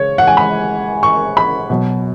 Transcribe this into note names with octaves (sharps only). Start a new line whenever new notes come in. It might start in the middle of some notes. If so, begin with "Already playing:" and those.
Already playing: C#3 G#3 C#5
F#5
G#5
B5
C#6
B5
B2 F#3